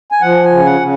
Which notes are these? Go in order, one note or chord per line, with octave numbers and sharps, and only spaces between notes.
G#5
F3 F#5
G#5
C#3
F#5
C#3